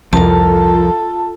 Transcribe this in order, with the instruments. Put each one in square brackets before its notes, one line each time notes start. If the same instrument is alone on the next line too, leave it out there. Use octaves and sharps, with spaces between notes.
[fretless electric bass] C2 F2 [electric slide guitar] F3 A#4 [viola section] F4 A4 [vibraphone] A5